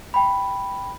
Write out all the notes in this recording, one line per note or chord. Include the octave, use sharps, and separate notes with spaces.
G5 B5